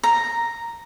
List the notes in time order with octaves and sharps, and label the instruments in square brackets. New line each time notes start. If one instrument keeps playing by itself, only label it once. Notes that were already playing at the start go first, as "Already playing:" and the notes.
[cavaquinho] A#5